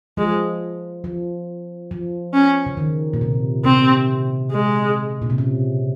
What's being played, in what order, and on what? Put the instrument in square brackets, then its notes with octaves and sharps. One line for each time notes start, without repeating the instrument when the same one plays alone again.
[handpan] F3 [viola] G#3
[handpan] F3
F3
[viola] C#4
[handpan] C#3
D#3
A#2
C3
[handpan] C3 [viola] C4
[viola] G#3
[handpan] A#2
C3
C#3